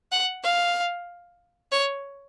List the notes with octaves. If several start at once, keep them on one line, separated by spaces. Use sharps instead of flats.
F#5
F5
C#5